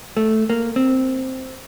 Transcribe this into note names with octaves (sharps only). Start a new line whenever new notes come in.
A3
A#3
C4